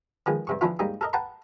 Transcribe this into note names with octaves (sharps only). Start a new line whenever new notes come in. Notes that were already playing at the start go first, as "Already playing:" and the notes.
D#3 F3 G#3 B3
G2 C3 C#6
E3 F3 B3 D4 E4 F4
G#2 G3 A#3 D#4
A4 A#4 D#5
B4 F#5 G5 A5 A#5 C6